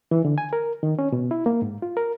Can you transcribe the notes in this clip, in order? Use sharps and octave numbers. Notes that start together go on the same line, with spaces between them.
E3
D3
G#5
A#4
D#3
C#4
B2
E4
A#3
G#2
F4
A#4